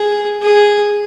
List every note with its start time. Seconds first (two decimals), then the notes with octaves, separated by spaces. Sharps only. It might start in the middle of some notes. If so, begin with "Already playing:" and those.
Already playing: G#4
0.42 G#4